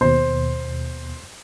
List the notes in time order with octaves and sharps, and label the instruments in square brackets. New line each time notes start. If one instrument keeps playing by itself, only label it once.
[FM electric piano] D#2 B2 [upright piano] C5